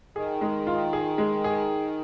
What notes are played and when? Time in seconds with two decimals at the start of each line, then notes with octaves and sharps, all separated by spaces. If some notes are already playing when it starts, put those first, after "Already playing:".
0.16 D#3 G#4
0.41 G#3
0.67 F4
0.93 G#4
1.18 G#3
1.44 G#4